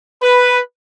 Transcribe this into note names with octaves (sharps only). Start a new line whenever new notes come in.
B4